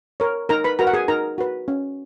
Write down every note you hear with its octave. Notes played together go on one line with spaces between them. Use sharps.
A#4 C#5
D#4 A#4 A#5
B4 B5
F#4 A#4 B4 A#5
F#5
G#4 G#5
D#4 A#4 A#5
F#4 B4
C#4